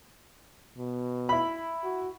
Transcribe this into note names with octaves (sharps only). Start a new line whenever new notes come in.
B2
E4 B5
F#4